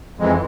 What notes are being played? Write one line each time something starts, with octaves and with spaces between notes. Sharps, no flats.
F2 E3 G#3